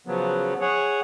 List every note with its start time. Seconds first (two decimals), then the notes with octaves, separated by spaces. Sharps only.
0.07 C#3 F3 F#3 B3
0.61 G#4 C#5 F#5